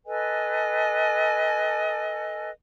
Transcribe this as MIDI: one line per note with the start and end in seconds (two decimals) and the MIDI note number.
0.06 2.50 69
0.06 2.50 71
0.06 2.50 75
0.06 2.50 80